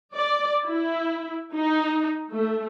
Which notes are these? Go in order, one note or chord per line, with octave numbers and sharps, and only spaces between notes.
D5
E4
D#4
A3